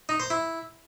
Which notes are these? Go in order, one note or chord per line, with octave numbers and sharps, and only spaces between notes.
D#4
C5
E4